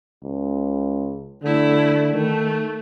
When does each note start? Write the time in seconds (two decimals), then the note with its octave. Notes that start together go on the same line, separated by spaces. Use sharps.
0.23 C#2
1.43 D3 A3 E4
2.14 D#3 A3